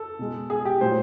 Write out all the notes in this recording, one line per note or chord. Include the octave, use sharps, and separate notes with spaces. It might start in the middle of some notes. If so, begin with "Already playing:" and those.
Already playing: A4
B2 G#3
G#4
G4
A#2 F#3 A3 C5